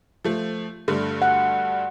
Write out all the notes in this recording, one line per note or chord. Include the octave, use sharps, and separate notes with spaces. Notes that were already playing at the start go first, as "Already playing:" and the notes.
F3 A3
G2 D3 A3
F#5